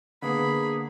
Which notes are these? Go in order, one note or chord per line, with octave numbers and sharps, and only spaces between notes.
D3 A#3 B3 G#4 B5